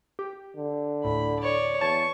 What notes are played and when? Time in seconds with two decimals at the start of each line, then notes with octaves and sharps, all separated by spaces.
0.19 G4
0.56 D3
1.05 D2 A2 B5
1.40 C#5 D5
1.81 E2 C#5 A5 C#6 A6